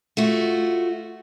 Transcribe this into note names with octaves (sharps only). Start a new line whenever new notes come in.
A3 F4 F#4